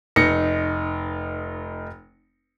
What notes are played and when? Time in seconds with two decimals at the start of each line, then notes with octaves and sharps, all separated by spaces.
0.16 F1 D#4 A#6 C#7